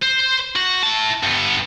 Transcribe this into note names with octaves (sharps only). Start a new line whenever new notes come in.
C5
F#4
E4 A5
G2 B3